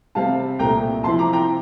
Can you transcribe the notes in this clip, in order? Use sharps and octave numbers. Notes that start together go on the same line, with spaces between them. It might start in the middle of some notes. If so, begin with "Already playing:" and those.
C3 G3 C4 F5 A5
C2 A#2 A3 G5 A#5
C3 F3 C4 E4 A5 C6
A#5 D6
G5 A#5